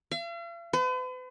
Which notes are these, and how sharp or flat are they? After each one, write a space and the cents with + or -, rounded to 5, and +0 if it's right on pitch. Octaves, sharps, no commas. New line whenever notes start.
F5 -45
B4 +45